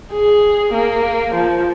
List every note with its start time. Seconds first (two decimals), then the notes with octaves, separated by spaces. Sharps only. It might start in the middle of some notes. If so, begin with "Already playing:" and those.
0.13 G#4
0.74 A#3
1.35 F3